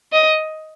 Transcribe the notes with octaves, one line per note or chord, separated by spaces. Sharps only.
D#5